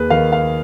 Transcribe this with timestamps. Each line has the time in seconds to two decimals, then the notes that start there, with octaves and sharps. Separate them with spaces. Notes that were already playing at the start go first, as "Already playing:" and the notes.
Already playing: D#2 G#4 B4
0.10 D#3 F5
0.32 F5